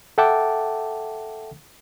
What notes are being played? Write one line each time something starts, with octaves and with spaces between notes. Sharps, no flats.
A4 E5 F#5 G5 A5 D6